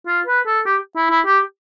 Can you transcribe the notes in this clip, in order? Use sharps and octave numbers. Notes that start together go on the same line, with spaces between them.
F4
B4
A4
G4
E4
E4
G4